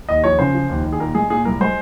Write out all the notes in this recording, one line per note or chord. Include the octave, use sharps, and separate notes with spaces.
D#2 D#5
F3 C#5
C#3 C5
F3
D#2
D#2
G#4
A#2 A#4
G#3 G#4
A#2 G#4
C2 A#4
G#3 C5